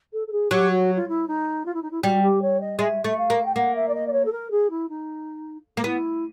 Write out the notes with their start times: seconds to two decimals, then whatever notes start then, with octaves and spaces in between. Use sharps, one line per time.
0.12 A4
0.27 A4
0.31 G#4
0.51 F#3 G4
0.70 F#4
0.96 F4
1.08 E4
1.27 D#4
1.65 F4
1.74 E4
1.82 D#4
1.91 E4
2.03 G3 F#4
2.22 G4
2.41 C#5
2.60 D#5
2.79 G#3 E5
3.04 A3 E5
3.17 F5
3.30 A#3
3.45 G5
3.55 A#3 F#5
3.75 E5
3.88 D5
3.94 D#5
4.07 D5
4.12 C#5
4.25 A4
4.32 A#4
4.50 G#4
4.70 E4
4.89 D#4
5.77 A#3
5.84 B3 E4